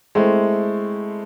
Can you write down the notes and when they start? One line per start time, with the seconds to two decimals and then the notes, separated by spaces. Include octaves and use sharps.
0.15 G#3 A3 C4 E4